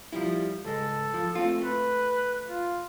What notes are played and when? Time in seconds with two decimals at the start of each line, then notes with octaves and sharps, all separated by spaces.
0.13 F3 G3 E4
0.64 C#2 G#2 G#3 A4
1.14 F3
1.35 A3 C4 F4
1.62 A3 B4
2.48 F4